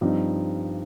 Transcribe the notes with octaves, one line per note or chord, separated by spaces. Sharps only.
G2 F3 C4 D#4